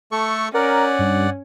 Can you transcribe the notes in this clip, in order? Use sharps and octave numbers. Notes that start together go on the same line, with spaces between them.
A3 A4 C#6
C#4 A#4 D5 F#5
G2